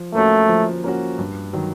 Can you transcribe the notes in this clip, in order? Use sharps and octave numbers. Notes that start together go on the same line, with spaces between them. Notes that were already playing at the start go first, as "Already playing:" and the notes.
Already playing: F3
A3 A#3 C#4 F#4
F3
A#3 C#4 F#4
G2
D#3 F#3